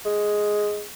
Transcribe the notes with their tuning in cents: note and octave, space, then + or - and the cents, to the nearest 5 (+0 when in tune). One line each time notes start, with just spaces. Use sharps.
G#3 +5